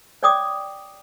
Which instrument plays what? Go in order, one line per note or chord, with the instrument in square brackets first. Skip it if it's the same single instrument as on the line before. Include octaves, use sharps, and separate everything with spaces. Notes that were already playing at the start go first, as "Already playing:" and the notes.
[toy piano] C#5 D5 G5 D6 D#6